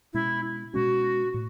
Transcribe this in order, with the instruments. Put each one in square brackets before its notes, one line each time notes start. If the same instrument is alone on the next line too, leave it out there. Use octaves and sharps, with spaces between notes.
[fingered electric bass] B2 G#3 C#4 [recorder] E4
[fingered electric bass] B2 G#3 C#4 [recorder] F#4
[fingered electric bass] A2